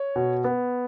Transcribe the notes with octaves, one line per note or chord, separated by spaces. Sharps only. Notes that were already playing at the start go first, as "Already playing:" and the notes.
Already playing: C#5
B2
B3